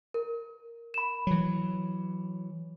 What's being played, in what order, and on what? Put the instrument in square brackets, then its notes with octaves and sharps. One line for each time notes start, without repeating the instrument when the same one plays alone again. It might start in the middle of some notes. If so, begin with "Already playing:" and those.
[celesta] A#4
B5 E7
[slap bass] E3 F#3